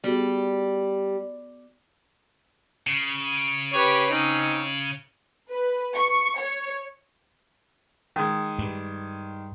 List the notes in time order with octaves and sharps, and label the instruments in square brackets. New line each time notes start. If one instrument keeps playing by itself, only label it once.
[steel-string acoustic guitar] G3 [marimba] B3 F#4 G#4
[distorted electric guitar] C#3
[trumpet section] G4 B4 C#5
C4 C#4 D#4
[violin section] B4
C#6
C#5
[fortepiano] D#3 G#3
[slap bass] G2